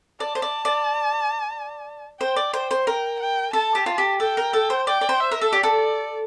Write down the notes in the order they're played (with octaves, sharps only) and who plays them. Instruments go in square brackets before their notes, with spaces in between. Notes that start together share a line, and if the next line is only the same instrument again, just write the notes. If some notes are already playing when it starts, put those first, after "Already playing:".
[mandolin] D5 [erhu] A5
[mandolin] C5
D5
D5
[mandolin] C5 [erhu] G5
[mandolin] D5
[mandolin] C5 [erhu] G5
[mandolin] C5
[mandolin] A#4 [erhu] G5
[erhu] G5
[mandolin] A4 [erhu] A5
[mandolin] G4
F4
G4
[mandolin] A4 [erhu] G5
[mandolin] A#4
A4
C5
[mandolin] D5 [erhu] G5
[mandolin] D5
C5
[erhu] E5
[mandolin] A#4
A4
[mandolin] G4 [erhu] D5
[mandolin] A4